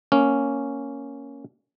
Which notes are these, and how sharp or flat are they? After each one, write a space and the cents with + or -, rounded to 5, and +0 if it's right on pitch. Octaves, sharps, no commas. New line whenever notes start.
A#3 +0 C#4 +0